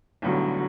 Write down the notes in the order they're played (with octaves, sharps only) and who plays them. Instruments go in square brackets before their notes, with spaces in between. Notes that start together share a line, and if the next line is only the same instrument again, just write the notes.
[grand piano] B1 A2 G3 B3 [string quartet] D3 F#3